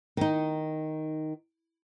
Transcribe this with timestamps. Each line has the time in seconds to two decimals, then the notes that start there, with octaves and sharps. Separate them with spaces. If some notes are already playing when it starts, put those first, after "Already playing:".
0.17 D#3 D#4